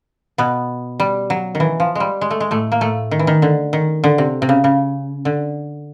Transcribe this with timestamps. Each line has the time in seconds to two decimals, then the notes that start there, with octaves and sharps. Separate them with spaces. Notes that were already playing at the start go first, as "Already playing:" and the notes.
0.38 B2 B3
1.00 G3
1.30 F#3
1.55 D#3
1.60 E3
1.80 F3
1.95 G3 G#3
2.21 G#3
2.31 A3
2.40 G#3
2.51 A2 A3
2.72 A#3
2.81 A2 A3
3.11 D#3
3.19 E3
3.27 D#3
3.42 D3
3.73 D#3
4.04 D3
4.18 C3
4.42 C3
4.49 C#3
4.64 C#3
5.25 D3